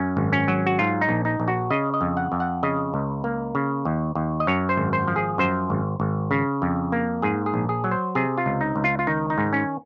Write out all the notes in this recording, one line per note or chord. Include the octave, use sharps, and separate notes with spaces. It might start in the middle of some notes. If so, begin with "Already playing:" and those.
Already playing: F#2 C#4
G#1
C#4
F#3
F#4
G#2 F4
D#4
A#1
D#4
A#1
F#4
C#3 D#5
D#5
F2
F#5
F2
F#5
C#3 D#5
C#2
A#3
C#3
D#2
D#2
D#5
F#2 C#5
C5
G#1
C5
F3
G#4
F#2 C5
G#1
G#1
C#3
F2
A#3
G#2 G#4
G#4
A#1
G#4
F#3
C5
C3 G#4
F4
C#2
D#4
C#2
F4
F4
D#3 D#4
D#4
G#2
C#4